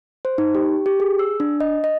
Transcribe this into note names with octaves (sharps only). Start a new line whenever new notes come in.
C5
D#4
G4
G4
G#4
E6
D4
D#5
D#5